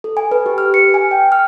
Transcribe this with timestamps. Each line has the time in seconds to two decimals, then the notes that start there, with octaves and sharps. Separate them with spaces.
0.04 A4
0.17 G#5
0.31 B4
0.46 G4
0.58 F6
0.74 C#7
0.94 G#5
1.11 G5
1.32 F6